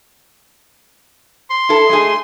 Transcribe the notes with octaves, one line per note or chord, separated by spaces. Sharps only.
C6
E4 A4
G#3 A3 G#4